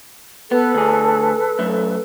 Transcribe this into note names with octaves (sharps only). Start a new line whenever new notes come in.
B3 A4 B4
D2 G#4
F#2 A3